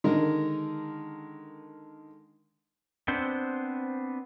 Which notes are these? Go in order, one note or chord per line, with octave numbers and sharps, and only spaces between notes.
D3 D#3 G#3 A#4
B3 C4 D4 C5